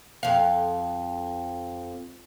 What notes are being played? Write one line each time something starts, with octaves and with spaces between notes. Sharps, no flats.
F2 F5